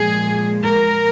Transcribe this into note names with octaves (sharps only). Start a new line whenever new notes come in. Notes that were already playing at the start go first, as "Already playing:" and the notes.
Already playing: A#2 F3 G#3 G#4
A#4